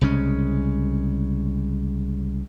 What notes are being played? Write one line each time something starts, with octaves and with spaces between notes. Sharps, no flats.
C2 C#3 G#3 C#4